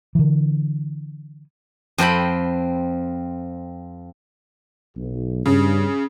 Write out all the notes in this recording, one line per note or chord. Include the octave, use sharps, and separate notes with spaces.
D3 E3
F2 C4 G5 B5
B1
G2 C#3